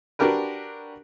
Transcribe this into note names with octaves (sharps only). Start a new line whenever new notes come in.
D4 F#4 G4 A#4 B4